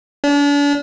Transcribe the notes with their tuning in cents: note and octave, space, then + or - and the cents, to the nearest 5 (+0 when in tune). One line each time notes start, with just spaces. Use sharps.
D4 -40